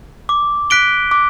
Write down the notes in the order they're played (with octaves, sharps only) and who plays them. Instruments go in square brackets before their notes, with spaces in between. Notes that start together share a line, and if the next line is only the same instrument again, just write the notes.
[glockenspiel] D6
F#6 B6 D7 G7
D6